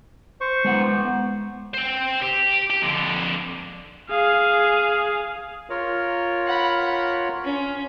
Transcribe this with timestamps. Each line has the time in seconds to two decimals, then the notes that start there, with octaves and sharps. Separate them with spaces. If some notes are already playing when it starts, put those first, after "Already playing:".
0.41 C5 C#6
0.65 G#3 B3 F#5
1.74 C5 G5
2.22 G4
2.70 G4
2.82 F2 D3
4.09 G#4 F5
5.70 F4 A#4 C#5
6.46 F#5 B5
7.45 C#4